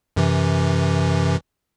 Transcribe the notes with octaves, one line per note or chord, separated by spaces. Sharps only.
F#2 C3 E3